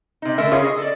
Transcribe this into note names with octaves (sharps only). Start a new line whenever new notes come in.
C3 D#4
D3 A3 A#4 E5
C#3 C#4 F4 G#4 C#5 F5
G#4 D#5
A4 D5